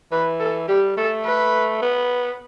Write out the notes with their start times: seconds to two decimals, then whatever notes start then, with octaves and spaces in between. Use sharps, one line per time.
0.12 E3 B4
0.40 A4
0.68 G3 G4
0.97 A3 A4
1.25 B4
1.82 B3